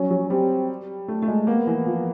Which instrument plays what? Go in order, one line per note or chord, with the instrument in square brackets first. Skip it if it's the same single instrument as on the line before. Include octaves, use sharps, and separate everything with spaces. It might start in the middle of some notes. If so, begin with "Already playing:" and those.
Already playing: [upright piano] F#3 [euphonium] C#4
[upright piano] F#3
[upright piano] G3 [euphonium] C4
[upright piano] A3
A3
G#3
[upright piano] A#3 [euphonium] B3
[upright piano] E3
F3